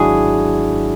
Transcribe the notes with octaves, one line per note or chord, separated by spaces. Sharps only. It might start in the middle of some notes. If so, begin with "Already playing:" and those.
Already playing: G#1 G#2 F#3 D4 E4 F#4 G#4